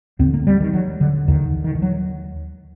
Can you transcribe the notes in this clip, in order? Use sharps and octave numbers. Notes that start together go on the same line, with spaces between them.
D#2 D3 C4
A#3
G3
D#3
F#3
D3
D#2 D3 D#3
D3
D#3
D#3
F#3